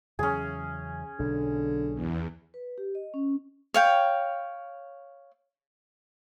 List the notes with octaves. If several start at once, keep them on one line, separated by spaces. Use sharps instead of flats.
E2 C#3 F#3 C#4 G#4
B1 D3
E2
B4
G4
D#5
C#4
C#5 F5 G5